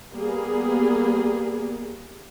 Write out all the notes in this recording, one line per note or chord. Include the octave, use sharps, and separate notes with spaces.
G3 A#3 B3 G#4